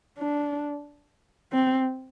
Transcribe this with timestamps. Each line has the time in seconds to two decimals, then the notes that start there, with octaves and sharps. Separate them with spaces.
0.19 D4
1.53 C4